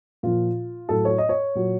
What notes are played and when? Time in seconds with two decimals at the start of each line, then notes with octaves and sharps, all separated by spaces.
0.23 A#2 F3 F4
0.89 A2 F#3 A4
1.05 C#5
1.18 D#5
1.29 C#5
1.55 A#2 F#3